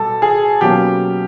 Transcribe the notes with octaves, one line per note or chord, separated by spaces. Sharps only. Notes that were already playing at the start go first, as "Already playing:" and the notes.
Already playing: B2 G3 A4
G#4
B2 F#3 A#3 C#4 G4